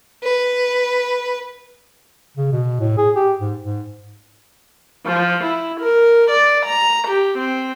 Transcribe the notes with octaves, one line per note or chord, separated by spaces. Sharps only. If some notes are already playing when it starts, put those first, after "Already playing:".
B4
C#3
B2
A2
G#4
G4
G#2
G#2
F3
E4
A#4
D5
A#5
G4
C4